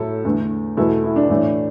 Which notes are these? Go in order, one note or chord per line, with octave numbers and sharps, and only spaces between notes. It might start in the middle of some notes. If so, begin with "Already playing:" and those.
Already playing: A2 F#3 A3 E4 A4
E2 D3 A3
E2 B2 A3 E4 A4
E4
D4
A2 E3 A3